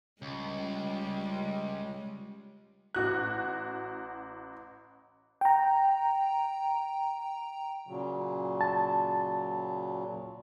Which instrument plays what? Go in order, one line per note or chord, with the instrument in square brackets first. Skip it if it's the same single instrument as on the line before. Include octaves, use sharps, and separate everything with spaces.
[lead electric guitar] C#2 [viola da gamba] G3 G#3
[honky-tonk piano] A1 F#4 F#6
[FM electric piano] G5 A#5
[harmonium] A#2 C#3 F#3
[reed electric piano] A5